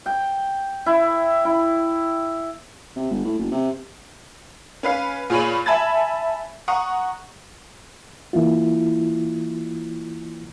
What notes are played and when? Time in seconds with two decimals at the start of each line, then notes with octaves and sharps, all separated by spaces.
0.06 G5
0.86 E4
1.45 E4
2.96 C3
3.11 G1
3.25 A2
3.39 F#1
3.52 C3
4.83 C#4 B4 F5
5.30 A#2 F4 G#4 C#5 B5 D#7
5.66 E5 G#5 A5 B5 G#6 A6
6.68 F#5 A#5 C#6 D#6
8.33 E3 A#3 E4 F4